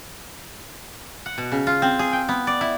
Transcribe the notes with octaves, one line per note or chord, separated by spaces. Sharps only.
F#5
B2
C#3
F4
C4
G#4
G5
B3
D5
E4